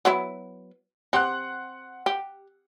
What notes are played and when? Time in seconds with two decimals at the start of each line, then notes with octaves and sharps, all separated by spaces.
0.05 F#3 B3 E4
1.13 C4 G4 F#5 C6 F#6
2.06 G4